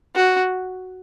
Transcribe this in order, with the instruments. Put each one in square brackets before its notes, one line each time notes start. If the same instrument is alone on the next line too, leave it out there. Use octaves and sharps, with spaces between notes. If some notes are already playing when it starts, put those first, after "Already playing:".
[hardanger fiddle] F#4